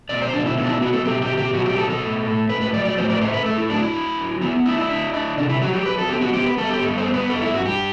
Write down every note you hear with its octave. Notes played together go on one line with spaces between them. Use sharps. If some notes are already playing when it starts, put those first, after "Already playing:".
B2 D5
C5
B2 D4
E4
B3 E4
D4
E4
F#3 F#4
A4
B2 G4
G4
B2
G4
F#3 F#4
G4
B2 A4
A4
A2
A2
A2 B4
B4
F#3 D5
D5
A2 C5
D5
B4
A3 C5
B4
A2 A4
E4
F#3 D4
E4
D4
F#3
B3 E4
D4 E4
E4
D4
D4
C3 D4
E4
F#3 F#4
G4
F#3 B4
A4
B3 G4
F#4
B3 G4
B4
B3 A4
G4
G2 A4
C5
B3
B4
G2 A4
E4
G2 F#4
G4